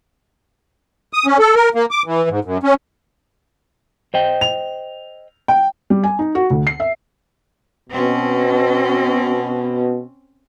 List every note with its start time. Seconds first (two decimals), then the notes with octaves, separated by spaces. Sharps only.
1.13 D#6
1.26 C#4
1.39 A4
1.55 A#4
1.75 A#3
1.91 D6
2.06 E3
2.29 G#2
2.45 F#2
2.63 C#4
4.14 C5 D#5 G5
4.41 F7
5.48 G5
5.90 G3
6.04 G#5
6.19 D#4
6.35 F#4
6.50 D2
6.67 C7
6.80 E5
7.90 B2 C4 C#4